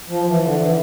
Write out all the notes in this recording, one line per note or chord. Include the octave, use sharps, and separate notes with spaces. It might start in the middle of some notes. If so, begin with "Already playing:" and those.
F3
E3
D3
E3